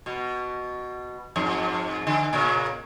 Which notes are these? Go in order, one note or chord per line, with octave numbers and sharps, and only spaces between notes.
B2
F2 G#2
D3
A#2 C#3 A#4